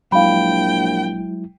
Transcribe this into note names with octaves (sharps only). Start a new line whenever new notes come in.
A#1 F#3 G#3 E4 F5 G5 B5